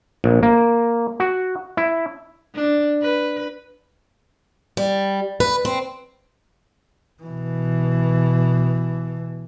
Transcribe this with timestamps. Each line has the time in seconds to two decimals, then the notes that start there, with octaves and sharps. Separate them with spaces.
0.24 A#1
0.43 A#3
1.20 F#4
1.77 E4
2.55 D4
3.03 B4
4.77 G3
5.40 B4
5.65 C4
7.23 B2 E3